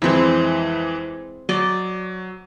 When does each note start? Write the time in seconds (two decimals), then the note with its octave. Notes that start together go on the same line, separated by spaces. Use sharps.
0.02 F2 E3 G#3 C4 E4
1.49 F#3 D5 D#5